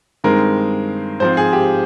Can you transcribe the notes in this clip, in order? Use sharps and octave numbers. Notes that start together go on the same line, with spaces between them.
G2 D#3 G#3 C4 A#4
G#2 F3 C4 C5
G#4
G4